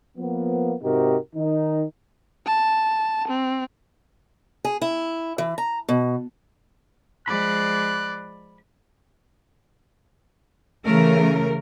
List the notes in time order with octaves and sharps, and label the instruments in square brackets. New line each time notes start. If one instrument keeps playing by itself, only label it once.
[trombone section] F3 A#3 B3
G#2 C3 D#4 F#4 G4 A#4
D#3 D#4
[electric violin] A5
C4
[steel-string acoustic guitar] G#4
E4
E3
A#5
B2
[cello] F3 G#3 [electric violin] D5 [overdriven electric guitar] B5 [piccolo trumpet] F#6
[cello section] C#3 E3 A3 A#4